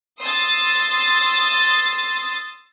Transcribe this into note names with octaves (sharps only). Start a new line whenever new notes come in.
C6 D#6 E6 A6